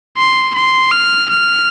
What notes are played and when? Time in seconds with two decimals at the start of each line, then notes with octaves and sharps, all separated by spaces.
0.17 C6
0.55 C6
0.91 F6
1.30 F6